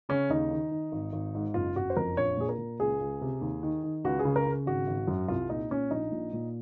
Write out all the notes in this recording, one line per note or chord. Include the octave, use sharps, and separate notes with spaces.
C#3 C#4
D#2 D#4
D#3
D#3
G#1
G#1
G#2
F#1 F4
F#1 F#4
C5
F2 A#4
A#1 C#5
A#2 G#4
A#4
A#2
C#2 G#4
C#2
C3
D#2
D#3
D#3
C#2 F#4
G#4
C#3
A#4
C#3
G#1 F#4
G#1
F#2
C2 F4
A#2 D#4
A#2 C#4
A#1 D#4
A#2
A#2